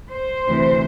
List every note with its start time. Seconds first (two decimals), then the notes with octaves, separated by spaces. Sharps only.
0.10 C5
0.48 D2 C3 E3